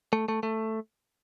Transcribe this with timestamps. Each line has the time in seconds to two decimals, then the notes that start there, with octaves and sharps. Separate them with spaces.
0.13 A3
0.28 A3
0.43 A3